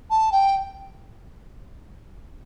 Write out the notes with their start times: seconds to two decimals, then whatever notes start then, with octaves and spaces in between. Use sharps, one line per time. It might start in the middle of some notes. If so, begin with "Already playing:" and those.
0.10 A5
0.32 G5